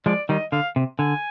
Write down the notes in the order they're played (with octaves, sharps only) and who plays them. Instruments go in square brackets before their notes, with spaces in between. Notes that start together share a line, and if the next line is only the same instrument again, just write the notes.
[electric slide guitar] F3 G#3 [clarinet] D5
[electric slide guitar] D#3 G3 [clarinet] D#5
[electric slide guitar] D3 [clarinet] F5
[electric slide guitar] C3
[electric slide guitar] D3 [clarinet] G#5